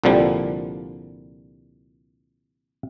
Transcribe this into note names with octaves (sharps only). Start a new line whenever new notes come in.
C2 A#2 D3 F3 G3